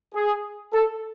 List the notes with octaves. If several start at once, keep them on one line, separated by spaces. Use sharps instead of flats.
G#4
A4